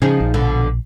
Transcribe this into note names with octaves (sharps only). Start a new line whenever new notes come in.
C#3 F3 D#4 G#4
A#1
B2 D3